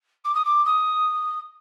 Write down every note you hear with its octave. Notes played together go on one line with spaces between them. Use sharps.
D6
D#6
D6
D#6